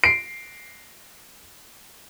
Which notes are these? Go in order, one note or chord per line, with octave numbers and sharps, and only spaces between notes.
C7 D7